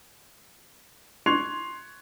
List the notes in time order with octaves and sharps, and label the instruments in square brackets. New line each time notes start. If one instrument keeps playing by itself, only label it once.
[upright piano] C6 C#6 F#6 G#6 C7 F7